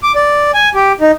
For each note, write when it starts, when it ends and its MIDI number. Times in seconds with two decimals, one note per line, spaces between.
0.03 0.12 86
0.15 0.51 74
0.54 0.69 80
0.75 0.92 67
1.01 1.12 63